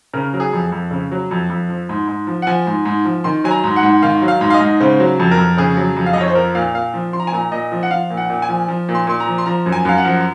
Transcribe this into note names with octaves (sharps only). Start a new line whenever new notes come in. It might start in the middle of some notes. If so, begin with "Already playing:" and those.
C#3 A#4
F#3
G#4
F2
F2
C#3
F#3
F2
F2
F3
G#2
G#2
F3
F#5
F3 G#5
G#2
G#2
F3
D#3 C6
F#3 G#5
A#5
G#2
F#5
G#2
D#3 F5
F#3
F5
G#2
F5
D#5
G#2
C#3 C5
F#3
F2
A#4
F2
C#3 G#4
F#3
F2
F5
F2 D#5
C#5
C5
F3 A#4
A#2 F5
A#2 F5
F3
F3 C6
A#5
G#5
A#2 A#5
A#2 D#5
F3
F#5
F3 F5
A#2
F#5
A#2
G#5
F3
F3
A#2
C6
A#2 C6
A#5
F3
C6
F3 A#5
F#2
G#5
F#2 F5
F#5
F3